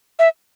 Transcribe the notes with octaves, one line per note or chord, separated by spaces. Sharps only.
E5